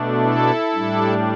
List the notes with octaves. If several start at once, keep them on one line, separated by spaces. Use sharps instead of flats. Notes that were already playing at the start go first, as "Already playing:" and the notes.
Already playing: B2 A3 D4
E4 A4
A2 G3 D4